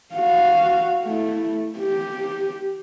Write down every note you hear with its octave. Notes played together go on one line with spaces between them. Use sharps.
F#4 F5
A3 E4
G4